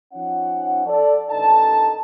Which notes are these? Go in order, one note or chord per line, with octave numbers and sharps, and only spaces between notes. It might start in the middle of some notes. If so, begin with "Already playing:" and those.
F3 C#4 D#4 F#5
A4 D5
A1 D#2 D4 D#4 A4 A5